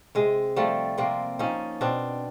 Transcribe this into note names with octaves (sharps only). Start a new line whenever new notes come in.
C3 G#3
F3 G3 A3
C3 A#3 C4
F3 C#4 D#4
B2 C4 D4